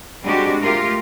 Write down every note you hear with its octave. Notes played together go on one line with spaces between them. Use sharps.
G3 G#3 C4 D4 F#4 G4
A3 F4 G4 A#4